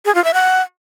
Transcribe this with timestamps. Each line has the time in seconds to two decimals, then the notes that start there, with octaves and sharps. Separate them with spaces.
0.05 G#4
0.15 F4
0.24 E5
0.34 F#5